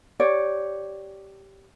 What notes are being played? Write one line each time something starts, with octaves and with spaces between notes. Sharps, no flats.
G4 C#5 D5